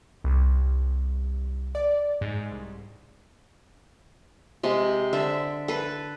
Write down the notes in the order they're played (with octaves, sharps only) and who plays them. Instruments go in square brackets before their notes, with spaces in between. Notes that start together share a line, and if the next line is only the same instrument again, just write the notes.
[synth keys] C2
D5
G#2
C2
[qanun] C3 G#3
D3 E5
A4 B4